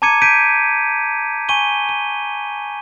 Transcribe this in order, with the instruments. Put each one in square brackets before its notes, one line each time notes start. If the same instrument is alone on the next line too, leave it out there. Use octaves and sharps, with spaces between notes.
[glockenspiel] A5 A#5 D6 G#6 C#7 D#7
G6 B6 D7 D#7
G#5 C#6 D#7 G7
D#7